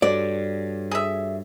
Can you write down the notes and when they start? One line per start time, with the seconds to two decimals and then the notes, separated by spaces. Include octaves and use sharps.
0.02 G2 F#4 A4 C#5 D5
0.91 G#4 E5